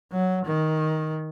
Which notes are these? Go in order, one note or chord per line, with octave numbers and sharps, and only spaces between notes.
F#3
D#3